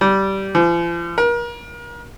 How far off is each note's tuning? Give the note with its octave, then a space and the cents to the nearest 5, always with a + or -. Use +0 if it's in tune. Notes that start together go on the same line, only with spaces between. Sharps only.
G3 -15
F3 -40
A#4 +35